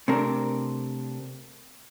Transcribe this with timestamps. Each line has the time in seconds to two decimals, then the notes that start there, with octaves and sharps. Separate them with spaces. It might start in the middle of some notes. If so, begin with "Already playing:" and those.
0.08 C3 A3 C4 D4 A#4